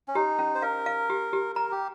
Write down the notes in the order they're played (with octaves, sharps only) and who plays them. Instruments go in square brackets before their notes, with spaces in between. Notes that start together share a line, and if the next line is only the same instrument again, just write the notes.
[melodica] C#4
[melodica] D#4 [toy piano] G4
[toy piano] C#4
[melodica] C5
[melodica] A#4 [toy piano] F5
[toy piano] F5
G4
G4
[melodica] A#4 [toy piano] A#5
[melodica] G4